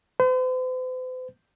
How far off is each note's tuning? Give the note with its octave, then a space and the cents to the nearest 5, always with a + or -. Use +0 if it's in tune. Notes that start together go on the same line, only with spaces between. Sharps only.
C5 -45